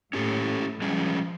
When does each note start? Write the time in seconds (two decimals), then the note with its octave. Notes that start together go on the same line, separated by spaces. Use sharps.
0.13 A2 C#4 G4 A4
0.82 F3 G3 G#3 C#4